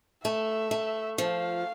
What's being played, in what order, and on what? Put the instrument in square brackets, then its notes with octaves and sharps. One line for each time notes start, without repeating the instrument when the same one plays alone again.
[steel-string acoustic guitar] A3 [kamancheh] E5
[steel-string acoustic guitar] A3
[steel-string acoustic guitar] F3 [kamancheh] F5